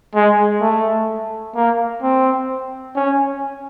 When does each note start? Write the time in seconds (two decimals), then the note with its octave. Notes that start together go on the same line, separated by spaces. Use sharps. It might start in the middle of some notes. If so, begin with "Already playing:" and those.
0.15 G#3
0.61 A3
1.55 A#3
2.03 C4
2.95 C#4